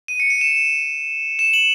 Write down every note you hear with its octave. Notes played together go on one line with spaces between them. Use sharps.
D#7
C#7
D#7
E7
E7
F#7